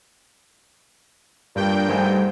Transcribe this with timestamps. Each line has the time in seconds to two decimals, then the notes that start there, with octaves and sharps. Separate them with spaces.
1.55 G2 A#2 G5
1.89 G#2 G3 A3 G#5